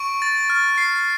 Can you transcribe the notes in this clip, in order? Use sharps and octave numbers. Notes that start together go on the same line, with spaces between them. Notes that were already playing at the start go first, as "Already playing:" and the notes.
Already playing: C#6 D7
A6
F6
C7